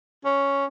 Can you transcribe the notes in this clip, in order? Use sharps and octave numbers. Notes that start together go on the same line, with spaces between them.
C#4